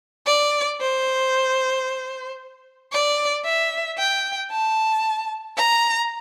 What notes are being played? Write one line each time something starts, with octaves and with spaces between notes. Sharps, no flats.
D5
C5
D5
E5
G5
A5
A#5